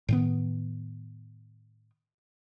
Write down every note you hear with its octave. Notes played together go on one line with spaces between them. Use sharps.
A2 D#3 B3